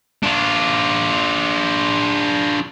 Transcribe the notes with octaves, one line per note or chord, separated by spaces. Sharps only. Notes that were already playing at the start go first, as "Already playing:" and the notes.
D4 F4